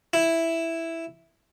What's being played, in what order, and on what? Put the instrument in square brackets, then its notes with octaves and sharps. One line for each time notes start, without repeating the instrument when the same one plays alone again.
[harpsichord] E4